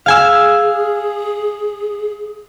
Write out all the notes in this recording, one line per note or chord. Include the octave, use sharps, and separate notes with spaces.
G#4 F5 G#5 E6